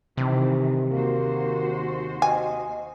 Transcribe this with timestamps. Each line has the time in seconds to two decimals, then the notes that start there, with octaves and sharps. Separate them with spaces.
0.17 C3 D#3 E3
0.91 D#2 A#3 F#4 C5
2.22 D#5 G#5